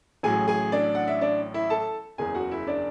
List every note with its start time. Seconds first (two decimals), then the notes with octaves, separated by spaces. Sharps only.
0.23 A1 A2 F#3 G#4 G#5
0.48 G#4 G#5
0.72 D4 D5
0.95 F#5
1.08 E5
1.21 D4 D5
1.54 E4 E5
1.70 A4 A5
2.18 F#1 E2 C#3 G#4 G#5
2.35 F#4 F#5
2.51 E4 E5
2.67 D4 D5